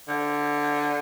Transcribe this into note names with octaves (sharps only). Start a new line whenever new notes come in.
D3